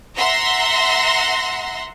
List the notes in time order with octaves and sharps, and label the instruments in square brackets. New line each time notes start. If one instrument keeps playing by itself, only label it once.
[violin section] E5 F#5 A#5 C6 A#6